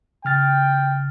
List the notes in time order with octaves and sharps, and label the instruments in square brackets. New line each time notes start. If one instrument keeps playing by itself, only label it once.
[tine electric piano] C#3 F6 A6 [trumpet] G5